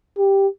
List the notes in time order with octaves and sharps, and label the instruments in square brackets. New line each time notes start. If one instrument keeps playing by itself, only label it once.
[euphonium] G4